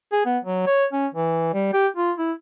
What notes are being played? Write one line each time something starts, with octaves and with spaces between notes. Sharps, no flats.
G#4
B3
F#3
C#5
C#4
E3
G3
G4
F4
E4